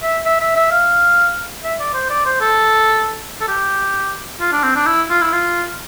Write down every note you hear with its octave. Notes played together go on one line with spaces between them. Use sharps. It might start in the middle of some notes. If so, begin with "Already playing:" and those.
E5
E5
E5
E5
F5
E5
D5
C5
D5
C5
A4
A4
G4
F4
D4
C4
D4
E4
F4
E4
F4